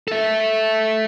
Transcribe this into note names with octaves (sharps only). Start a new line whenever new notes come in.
A4 E5